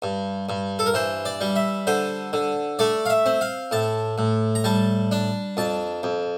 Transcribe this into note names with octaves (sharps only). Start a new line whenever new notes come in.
G2
G2
A4
A#4
E3 C5
D5
G3
E5
D3 C5
D3
A3 D5
F5
E5
C4
F5
A2 A5
A2
A#5
G3 A5
D4
F2 A5
F2